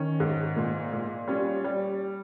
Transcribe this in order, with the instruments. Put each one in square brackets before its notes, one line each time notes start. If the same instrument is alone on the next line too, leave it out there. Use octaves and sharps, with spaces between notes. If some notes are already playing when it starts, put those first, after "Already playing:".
Already playing: [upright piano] D#3 C#4
G#2
A#2
A#2
G3 C#4
G3